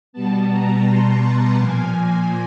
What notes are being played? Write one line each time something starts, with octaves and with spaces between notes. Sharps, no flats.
B2 G3 B3 A5
A#5
C6
A#5
A#2 F3 A#3 G#5